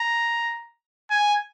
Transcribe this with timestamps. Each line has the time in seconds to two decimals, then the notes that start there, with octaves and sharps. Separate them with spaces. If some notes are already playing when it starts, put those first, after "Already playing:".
Already playing: A#5
1.10 G#5